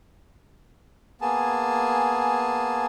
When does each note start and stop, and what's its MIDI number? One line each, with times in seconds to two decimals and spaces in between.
1.21 2.86 58
1.21 2.86 59
1.21 2.86 68
1.21 2.86 80
1.21 2.86 81